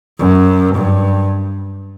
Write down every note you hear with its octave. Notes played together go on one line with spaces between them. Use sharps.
F#2
G2